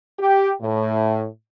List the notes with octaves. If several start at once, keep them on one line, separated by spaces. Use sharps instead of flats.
G4
A2